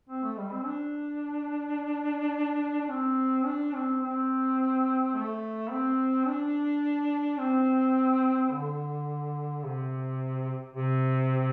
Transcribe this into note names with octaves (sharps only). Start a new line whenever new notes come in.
C4
A3
G3
C4
D4
D4
C4
D4
C4
C4
A3
C4
D4
C4
D3
C3
C3